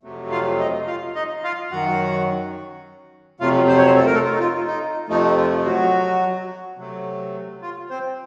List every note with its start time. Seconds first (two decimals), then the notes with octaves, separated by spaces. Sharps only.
0.03 F2 C3 F#3 A3
0.31 F4 F5
0.59 D#4 D#5
0.87 F4 F5
1.15 D#4 D#5
1.43 F4 F5
1.71 F#2 D#3 F#3 F#4 F#5
3.40 F2 C3 F#3 A3 F4 F5
3.68 C5
3.77 C#5
3.86 C4 C5
3.96 A4
4.06 A#4
4.14 A3 A4
4.25 F4
4.32 D#4
4.39 F4
4.67 D#4
5.08 F2 C3 F3 A3 D#4
5.37 F4
5.65 F#3 F#4
6.77 C3 F#3 A3
7.61 F4
7.90 C4 C5